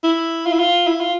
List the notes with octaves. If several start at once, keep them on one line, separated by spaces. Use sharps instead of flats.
E4
F4
E4
F4
E4
F4